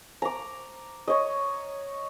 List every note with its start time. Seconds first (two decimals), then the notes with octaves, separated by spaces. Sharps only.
0.22 A#5 D6
1.08 C#5 D#5